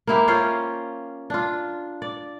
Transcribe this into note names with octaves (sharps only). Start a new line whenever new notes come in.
A#3 E4 G4
C#4 F4 C5
D4 F4
D5